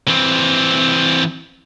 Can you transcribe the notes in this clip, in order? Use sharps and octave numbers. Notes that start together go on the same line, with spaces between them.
E3 C4